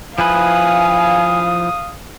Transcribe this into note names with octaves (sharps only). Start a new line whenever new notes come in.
F3 E4 B4 F5 G#5 D#6